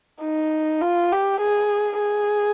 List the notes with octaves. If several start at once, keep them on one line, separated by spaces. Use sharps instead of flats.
D#4
F4
G4
G#4
G#4